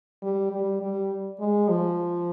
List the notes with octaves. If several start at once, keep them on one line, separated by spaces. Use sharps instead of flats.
G3
G3
G3
G#3
F3